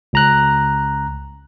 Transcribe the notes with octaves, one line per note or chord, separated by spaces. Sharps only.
C#2 A#5 F#6